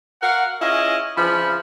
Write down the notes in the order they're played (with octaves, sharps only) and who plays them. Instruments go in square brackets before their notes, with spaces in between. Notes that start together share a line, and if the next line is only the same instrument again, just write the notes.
[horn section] F#4 A#4 F5 F#5
C#4 E4 F4 G#4 C#5 D#5
C#3 E3 F3 D4 B5